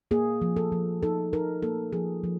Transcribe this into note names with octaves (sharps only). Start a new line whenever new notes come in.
A#3 G#4
F3
A4
F3
D#4 A4
D#4 A#4
A#3 A4
F3 G#4
F3